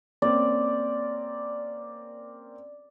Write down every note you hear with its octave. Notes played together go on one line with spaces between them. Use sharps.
A#3 C4 C#4 D5